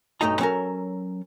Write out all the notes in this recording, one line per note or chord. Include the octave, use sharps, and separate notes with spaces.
B1 G2 A3 D#4 D#5 A#5
F#3 C#4 A4 A#4